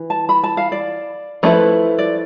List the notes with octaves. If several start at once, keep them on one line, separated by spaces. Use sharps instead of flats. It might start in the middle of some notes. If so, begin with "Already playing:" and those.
Already playing: E3
A5
B5
A5
F5
D5
F3 A3 E4 B4
D5